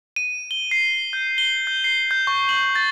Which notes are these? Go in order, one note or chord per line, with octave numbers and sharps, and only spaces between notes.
D#7
G7
C7
G6
G7
G6
C7
G6
C#6
F#7
A6